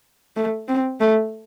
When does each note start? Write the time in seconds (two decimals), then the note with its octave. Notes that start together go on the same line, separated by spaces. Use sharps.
0.36 A3
0.68 C4
1.00 A3